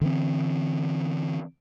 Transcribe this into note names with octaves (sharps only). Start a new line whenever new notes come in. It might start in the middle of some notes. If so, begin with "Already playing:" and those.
D3 E3 C4